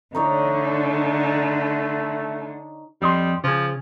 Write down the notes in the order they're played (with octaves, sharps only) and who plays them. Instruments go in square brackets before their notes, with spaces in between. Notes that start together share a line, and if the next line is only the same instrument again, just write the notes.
[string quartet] D3 [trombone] A3 [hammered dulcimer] D#4 C#5 D5
[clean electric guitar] F2 D#5 C6 [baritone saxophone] G3
[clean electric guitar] C#3 G#4 [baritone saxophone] F3